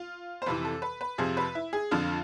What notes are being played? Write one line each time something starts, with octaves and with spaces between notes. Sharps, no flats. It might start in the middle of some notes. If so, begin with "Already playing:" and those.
Already playing: F4
C5
F2 C3 E3 B4
A4
B4
B4
F2 C3 F3 G#4
B4
E4
G#4
F2 D3 F3 F4